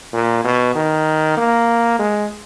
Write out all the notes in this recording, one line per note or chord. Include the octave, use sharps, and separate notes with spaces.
A#2
B2
D#3
A#3
G#3